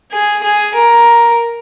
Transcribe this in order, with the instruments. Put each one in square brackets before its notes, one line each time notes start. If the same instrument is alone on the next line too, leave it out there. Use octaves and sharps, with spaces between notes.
[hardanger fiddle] G#4
G#4
A#4